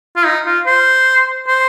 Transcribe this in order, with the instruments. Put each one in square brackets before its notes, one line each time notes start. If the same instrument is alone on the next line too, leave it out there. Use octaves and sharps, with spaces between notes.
[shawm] F4
D#4
F4
C5
C5